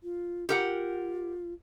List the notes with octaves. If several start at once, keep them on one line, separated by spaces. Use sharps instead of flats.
F4
F4 G4 A#4 F#5